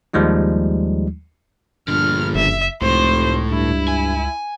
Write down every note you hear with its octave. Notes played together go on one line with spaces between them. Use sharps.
D#2 F3 G3 G#3 D#4
A#1 G2 D3 F6
F#1 E5
F1 C#2 A2 C5
G2 E4
G#5